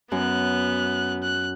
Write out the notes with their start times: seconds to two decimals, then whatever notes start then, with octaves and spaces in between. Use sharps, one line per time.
0.12 F#2 B3 F#6
1.23 F#6